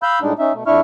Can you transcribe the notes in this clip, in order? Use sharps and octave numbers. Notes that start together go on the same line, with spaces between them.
F5 B5 E6 G6
A2 G3 G#3 D4 D#4
C#4 D#4 E5
B2 A3
F2 D4 E4 E5 C#6 F6